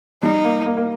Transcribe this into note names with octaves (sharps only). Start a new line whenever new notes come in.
G3 D#4
A#3
A#3
A#3